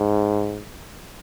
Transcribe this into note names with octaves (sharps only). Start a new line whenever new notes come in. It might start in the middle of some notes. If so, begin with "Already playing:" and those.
Already playing: G#2